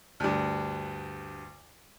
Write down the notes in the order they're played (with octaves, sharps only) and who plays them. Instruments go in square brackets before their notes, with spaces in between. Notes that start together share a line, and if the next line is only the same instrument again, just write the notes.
[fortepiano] D2 G2